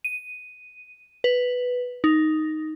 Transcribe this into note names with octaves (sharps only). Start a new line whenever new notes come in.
D#7
B4
D#4